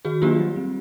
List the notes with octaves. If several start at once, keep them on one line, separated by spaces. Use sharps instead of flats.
D#3 F#4 G#4
F#3 A#3 D4 F4 G4
G3
C4